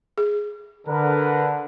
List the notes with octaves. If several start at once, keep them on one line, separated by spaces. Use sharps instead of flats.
G#4
D3 A#4 B4